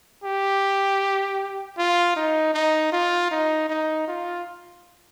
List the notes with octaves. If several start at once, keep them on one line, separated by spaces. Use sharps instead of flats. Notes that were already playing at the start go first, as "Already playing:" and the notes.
G4
F4
D#4
D#4
F4
D#4
D#4
F4